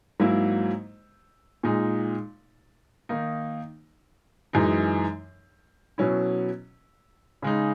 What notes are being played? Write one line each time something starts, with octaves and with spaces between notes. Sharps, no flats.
G#2 F#3 A#3 E4
A#2 G#3 D#4
D#3 A#3 D#4
F#2 E3 G#3 D#4
B2 F#3 C#4 E4
C#3 G#3 D#4